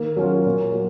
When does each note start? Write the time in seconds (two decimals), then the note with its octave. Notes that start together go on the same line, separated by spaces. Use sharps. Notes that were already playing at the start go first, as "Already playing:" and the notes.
Already playing: D#3 A#3
0.16 F#3 C#4 F4
0.46 A#2
0.73 F#3